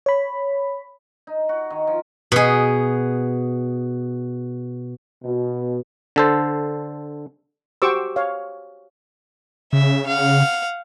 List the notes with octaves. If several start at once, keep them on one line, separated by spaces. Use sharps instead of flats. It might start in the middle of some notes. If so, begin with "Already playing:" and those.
C#5 B5
D#4
F#4
D#3
F3
B2 G#4
B2
D3 A4 C5
F#4 G4 C5 C#6 D6 E6
C#5 F5
C#3 E5
F5 F#5